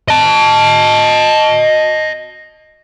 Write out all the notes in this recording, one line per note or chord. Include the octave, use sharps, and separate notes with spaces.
D#5 A5